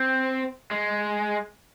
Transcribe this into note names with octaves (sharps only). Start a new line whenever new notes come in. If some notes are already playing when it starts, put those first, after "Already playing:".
Already playing: C4
G#3